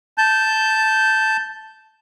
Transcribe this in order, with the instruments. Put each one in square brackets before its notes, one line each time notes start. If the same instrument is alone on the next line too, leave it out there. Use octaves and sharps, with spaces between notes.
[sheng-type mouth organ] A5 G6